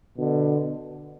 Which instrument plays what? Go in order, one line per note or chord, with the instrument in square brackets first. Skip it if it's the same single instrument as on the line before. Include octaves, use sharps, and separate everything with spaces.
[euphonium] B2 [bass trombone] D3